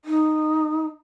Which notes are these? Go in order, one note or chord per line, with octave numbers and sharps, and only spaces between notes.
D#4